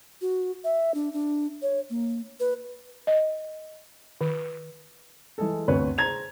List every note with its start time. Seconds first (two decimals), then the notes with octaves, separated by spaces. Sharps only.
0.21 F#4
0.64 E5
0.94 D4
1.13 D4
1.62 C#5
1.90 A#3
2.40 B4
3.07 D#5
4.21 D#3
5.38 E3 G#3 G#4 A4
5.68 G1 D2 C4 B4 C#5
5.98 G#4 C5 A#5 G#6 F7